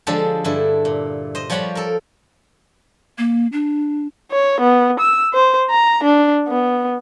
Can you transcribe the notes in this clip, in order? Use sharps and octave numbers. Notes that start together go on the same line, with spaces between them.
D3 F3 G#3 D4 G4 A4
G2 D3 E4
A#2
C5 D#5
F3 G3 C#5 F#5 G5 B5
A4 A#4
A#3
D4
C#5
B3
E6
C5
A#5
D4
B3